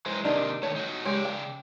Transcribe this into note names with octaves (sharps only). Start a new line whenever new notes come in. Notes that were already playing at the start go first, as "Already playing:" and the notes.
E3 F#3 G#3 C5
C3 D#3 A#3 D4 D#4
D#3 A3 C#5
D#4 F#4
C#3 G#3 G4 C#5 D5
G5